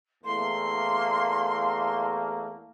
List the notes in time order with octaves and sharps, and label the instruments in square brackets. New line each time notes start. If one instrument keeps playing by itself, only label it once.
[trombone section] E2 A3 A#3 [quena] C6